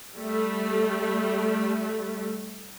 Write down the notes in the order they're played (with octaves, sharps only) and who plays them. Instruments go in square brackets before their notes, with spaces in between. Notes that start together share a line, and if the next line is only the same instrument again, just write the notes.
[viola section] G3 A3